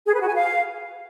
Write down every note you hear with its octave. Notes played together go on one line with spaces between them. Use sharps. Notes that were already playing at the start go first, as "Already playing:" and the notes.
G#4
B4
F#4
G#5
F5